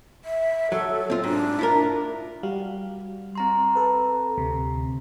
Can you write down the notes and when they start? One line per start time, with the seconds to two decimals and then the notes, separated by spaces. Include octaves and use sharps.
0.25 E5
0.72 F#3 A4
1.10 C4 F4
1.24 G#2 D4
1.59 E4 F4 A#4
2.43 G3 F#4 F5
3.35 C4 A#5 C6
3.75 A4 B4
4.38 D2 C3